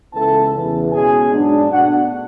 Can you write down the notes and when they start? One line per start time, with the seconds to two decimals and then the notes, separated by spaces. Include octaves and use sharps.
0.13 C#2 C#3 E3 B3 E4 A4 A5
0.53 E2 C#3 E3
0.92 B2 G#3 C#4 G#4 G#5
1.32 G#2 F#3 B3 D4
1.71 B2 A3 D4 F#4 F#5